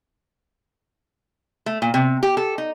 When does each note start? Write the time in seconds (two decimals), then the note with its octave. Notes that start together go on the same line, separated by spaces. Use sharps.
1.66 A3
1.82 A#2
1.94 C3
2.23 G4
2.37 A4
2.58 D#4